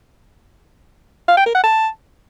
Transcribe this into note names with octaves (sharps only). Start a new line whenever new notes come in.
F5
G5
A#4
F#5
A5